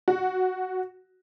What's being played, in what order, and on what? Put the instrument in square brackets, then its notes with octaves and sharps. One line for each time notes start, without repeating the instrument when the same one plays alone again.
[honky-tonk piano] F#4